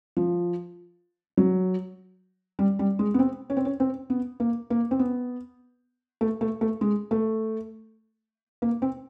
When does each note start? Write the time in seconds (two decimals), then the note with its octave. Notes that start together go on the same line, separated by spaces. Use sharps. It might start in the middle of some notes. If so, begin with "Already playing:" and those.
0.17 F3
1.37 F#3
2.59 G3
2.79 G3
2.99 G#3
3.14 B3
3.19 C4
3.50 C#4
3.57 C4
3.65 C#4
3.80 C4
4.10 B3
4.40 A#3
4.70 A#3
4.91 C4
4.99 B3
6.21 A3
6.41 A3
6.61 A3
6.81 G#3
7.11 A3
8.62 A#3
8.82 C4